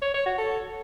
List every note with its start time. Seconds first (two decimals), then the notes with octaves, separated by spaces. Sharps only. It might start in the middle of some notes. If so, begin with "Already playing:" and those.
0.02 C#5
0.14 C#5
0.26 F#4
0.38 A4